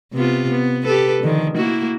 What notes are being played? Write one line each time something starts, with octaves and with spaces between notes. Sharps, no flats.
C3 B3 F4
B3
G4 A4 B4
D3 D#3 F3
A#3 E4 F#4